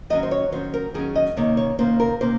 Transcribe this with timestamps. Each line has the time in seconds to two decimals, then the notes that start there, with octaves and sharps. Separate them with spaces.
0.10 D#3 F#3 C#4 D#5
0.23 C5
0.31 C#5
0.52 D#3 F#3 C#4 C5
0.74 A#4
0.94 D#3 F#3 C#4 G#4
1.16 D#5
1.36 C3 D#3 A#3 C#4 C#5
1.57 C#5
1.78 C3 D#3 A#3 C#4 C5
2.00 A#4
2.21 C3 D#3 A#3 C#4 C5